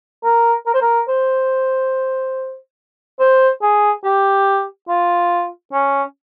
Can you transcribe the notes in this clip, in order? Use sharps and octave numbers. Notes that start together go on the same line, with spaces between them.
A#4
A#4
C5
A#4
C5
C5
G#4
G4
F4
C#4